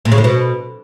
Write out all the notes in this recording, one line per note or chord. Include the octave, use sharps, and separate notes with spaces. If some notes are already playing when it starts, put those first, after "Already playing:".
A#2
C#3
A2
B2